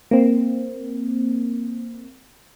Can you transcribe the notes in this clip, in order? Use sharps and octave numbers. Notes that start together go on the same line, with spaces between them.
A#3 C4